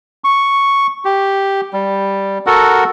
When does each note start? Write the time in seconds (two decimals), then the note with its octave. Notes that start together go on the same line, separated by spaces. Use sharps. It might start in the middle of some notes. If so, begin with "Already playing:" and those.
0.24 C#6
1.05 G4
1.73 G3
2.46 F#4 A4 A#4 F#5